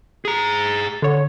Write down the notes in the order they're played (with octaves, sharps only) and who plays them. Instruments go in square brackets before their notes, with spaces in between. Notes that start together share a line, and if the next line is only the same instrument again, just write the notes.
[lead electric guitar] G#4 A#5
[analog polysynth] D3 C#5